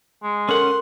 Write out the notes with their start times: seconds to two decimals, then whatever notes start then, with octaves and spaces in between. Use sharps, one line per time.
0.23 G#3
0.49 C#4 A4 A#4 F#5 C6